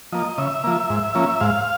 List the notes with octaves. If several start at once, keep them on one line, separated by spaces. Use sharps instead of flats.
F3 A#3 D#5
C#3 E5
F3 A#3
G#2
F3 A#3 C#4
G#2 F5